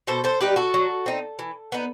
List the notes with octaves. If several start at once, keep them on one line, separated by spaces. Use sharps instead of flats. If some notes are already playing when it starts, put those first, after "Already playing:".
B2 A4 C5
A4 C5
G3 D#4 G4 B4
F#4 A4
F#3
C4 D#4
E3
B3 D#4